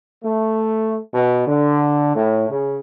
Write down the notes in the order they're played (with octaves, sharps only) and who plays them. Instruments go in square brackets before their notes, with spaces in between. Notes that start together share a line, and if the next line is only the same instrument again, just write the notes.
[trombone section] A3
B2
D3
A2
C#3